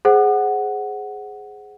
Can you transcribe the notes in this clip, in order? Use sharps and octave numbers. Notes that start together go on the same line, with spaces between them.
G#4 C5 F#5